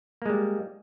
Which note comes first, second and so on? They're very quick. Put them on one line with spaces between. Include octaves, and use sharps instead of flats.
A#3 G#3 G3